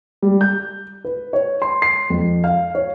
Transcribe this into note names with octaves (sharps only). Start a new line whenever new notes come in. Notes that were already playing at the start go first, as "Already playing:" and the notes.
G3
G6
B4
C#5
C6
C7
F2
F5
C#5